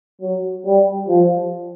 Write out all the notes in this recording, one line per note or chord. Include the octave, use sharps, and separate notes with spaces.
F#3
G3
F3